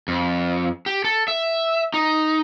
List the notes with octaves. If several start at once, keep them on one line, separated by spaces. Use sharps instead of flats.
F2
G4
A4
E5
D#4